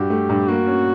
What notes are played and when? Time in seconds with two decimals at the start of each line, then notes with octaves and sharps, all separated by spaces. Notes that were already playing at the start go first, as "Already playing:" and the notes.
Already playing: G2 F#4 G4
0.10 A3
0.29 G2
0.48 A#3 F#4
0.67 C#4